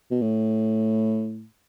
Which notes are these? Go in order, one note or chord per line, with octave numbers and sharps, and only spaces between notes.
B2
A2